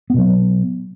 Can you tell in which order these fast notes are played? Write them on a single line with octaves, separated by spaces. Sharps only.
B3 B2 F#3